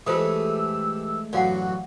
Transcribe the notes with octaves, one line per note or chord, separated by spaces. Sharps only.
E3 G#3 A3 F4 G4 C5 D#6 E6
A1 F#2 F#3 F#4 D5 F5 F#5